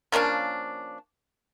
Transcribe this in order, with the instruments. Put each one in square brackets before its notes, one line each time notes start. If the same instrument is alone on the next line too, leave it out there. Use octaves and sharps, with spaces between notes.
[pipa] F3 A#3 C#4 D4